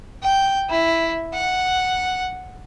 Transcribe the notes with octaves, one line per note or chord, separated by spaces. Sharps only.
G5
E4
F#5